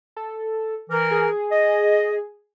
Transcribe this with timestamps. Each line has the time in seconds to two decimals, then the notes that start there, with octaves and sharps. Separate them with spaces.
0.16 A4
0.90 E3 A#4
1.11 G#4
1.52 D#5